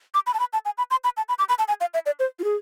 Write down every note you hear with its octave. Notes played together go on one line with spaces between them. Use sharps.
D6
B5
A5
B5
A5
G#5
B5
C6
B5
A5
B5
D6
B5
A5
G#5
F5
E5
D5
C5
F4
G#4